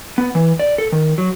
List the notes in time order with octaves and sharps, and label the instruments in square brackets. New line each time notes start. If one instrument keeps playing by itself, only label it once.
[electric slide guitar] B3
E3
D5
A4
D#3
F#3